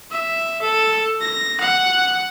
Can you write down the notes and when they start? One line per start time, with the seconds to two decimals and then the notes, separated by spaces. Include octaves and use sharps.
0.11 E5
0.62 A4
1.21 A#6
1.61 F#5